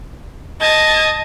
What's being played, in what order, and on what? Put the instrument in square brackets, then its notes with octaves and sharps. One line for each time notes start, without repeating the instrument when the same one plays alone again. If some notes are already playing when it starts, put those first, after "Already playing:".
[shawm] D#5 [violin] A5 G#6